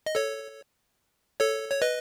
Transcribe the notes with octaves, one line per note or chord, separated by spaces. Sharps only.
D#5
A4 C#5
A4 C#5
C#5
B4 D#5